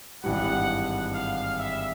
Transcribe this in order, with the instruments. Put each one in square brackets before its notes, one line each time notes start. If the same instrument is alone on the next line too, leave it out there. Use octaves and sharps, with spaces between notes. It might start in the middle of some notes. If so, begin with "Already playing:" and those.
[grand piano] G#1 G2 E3 G3 [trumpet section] F#5
[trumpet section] F5
E5